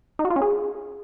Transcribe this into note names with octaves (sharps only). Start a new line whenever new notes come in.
D#4
F#4
F4
C#4
G#4